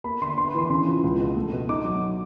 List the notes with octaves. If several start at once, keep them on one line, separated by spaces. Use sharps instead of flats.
A#3 B5
D3 C6
B3 C6
B5
E3 C6
C#3 C6
F3
C#2
B2
A3
B2
D#4 D6
F#3